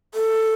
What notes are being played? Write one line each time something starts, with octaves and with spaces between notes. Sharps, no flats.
A4